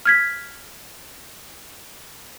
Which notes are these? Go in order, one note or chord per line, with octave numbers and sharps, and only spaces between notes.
F6 G#6 B6